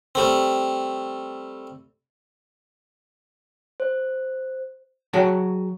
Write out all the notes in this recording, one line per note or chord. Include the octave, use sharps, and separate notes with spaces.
G3 A3 C4
C5
F#3 F#4 G#4 F#5 G5 A5